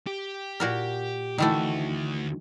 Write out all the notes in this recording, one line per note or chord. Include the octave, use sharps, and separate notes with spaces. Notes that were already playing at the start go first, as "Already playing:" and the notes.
G4
A#2 F#4 A#4
D2 D#3 E3 A3 F#4